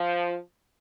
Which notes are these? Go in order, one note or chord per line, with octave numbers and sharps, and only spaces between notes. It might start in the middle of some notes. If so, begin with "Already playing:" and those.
Already playing: F3